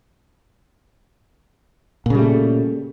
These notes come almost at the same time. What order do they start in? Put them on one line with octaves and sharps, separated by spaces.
A#2 C#3 G3 A3